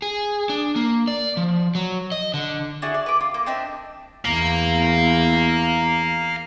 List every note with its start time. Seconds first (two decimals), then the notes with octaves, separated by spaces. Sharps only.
0.02 G#4
0.49 D4
0.76 A#3
1.08 D5
1.37 F3
1.75 F#3
2.12 D#5
2.34 D3
2.82 D4 E4 F#4 G#4
2.94 D5
3.06 B4 D6
3.21 F4
3.34 A#3 D6
3.46 C4 D4 D#4 E5
4.25 E2 F5 A#5